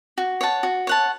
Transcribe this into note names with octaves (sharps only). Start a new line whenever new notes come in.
F#4
C#5 F#5 A5
F#4
C#5 F#5 A5